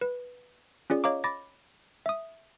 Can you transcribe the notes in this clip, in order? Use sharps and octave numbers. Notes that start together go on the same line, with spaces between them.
B4
C#4 F4 G#4 D5
C#5 D#5 F5 A#5 D6
B5 D6 A6 A#6
E5 D#6